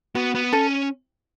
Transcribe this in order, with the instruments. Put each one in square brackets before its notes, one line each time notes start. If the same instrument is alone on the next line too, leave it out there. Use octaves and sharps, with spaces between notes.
[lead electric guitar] B3 [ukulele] F#4
[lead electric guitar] B3
[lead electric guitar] C#4 [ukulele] A4